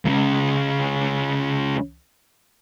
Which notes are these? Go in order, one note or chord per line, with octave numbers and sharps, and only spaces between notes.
C#2 C#3